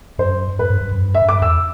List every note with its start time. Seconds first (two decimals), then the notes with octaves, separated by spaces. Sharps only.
0.19 F#2 C5
0.59 G2 B4
0.70 G2
0.81 F#2
0.91 F#2
1.01 G2
1.15 E5
1.22 G2
1.29 D6
1.42 E2 E6